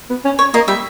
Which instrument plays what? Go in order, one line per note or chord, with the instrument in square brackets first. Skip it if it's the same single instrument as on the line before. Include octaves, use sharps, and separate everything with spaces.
[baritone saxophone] B3
C#4
[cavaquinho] C#5
[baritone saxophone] A#3 [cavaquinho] D#5
[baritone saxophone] G3 [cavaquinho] E5